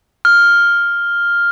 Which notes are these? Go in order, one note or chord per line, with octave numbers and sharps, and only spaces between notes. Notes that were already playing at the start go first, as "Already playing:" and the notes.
F6